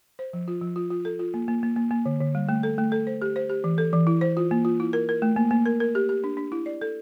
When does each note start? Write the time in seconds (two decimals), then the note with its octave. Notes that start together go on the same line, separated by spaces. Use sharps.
0.19 C5
0.33 F3
0.48 F4
0.62 F3
0.76 F4
0.90 F4
1.05 A4
1.19 F4
1.34 A#3
1.48 A#3
1.63 A#3
1.76 A#3
1.91 A#3
2.06 D3
2.21 D3
2.35 G3
2.49 A3
2.63 A4
2.78 A3
2.92 A4
3.07 C5
3.22 G4
3.36 C5
3.49 G4
3.64 E3
3.78 A4
3.93 E3
4.07 E4
4.21 C5
4.37 F4
4.51 A#3
4.65 F4
4.80 E4
4.93 A#4
5.09 A#4
5.22 A3
5.36 A#3
5.51 A#3
5.66 A#4
5.80 A#4
5.95 G4
6.09 G4
6.24 D4
6.37 D4
6.52 E4
6.66 D5
6.81 A4